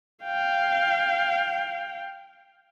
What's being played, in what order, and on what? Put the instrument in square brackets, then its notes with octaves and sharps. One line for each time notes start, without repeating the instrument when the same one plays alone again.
[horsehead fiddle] F5 G5